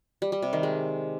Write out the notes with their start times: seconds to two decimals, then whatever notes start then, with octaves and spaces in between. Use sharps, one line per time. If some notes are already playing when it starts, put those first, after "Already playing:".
0.22 G3
0.32 G3
0.42 C3
0.53 D#3
0.63 G#3